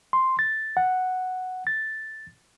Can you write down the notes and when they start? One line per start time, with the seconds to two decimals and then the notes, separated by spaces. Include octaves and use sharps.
0.13 C6
0.39 A6
0.77 F#5
1.67 A6